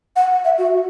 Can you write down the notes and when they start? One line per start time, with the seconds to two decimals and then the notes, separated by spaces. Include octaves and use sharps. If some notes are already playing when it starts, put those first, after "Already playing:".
0.16 F#5
0.44 E5
0.58 F#4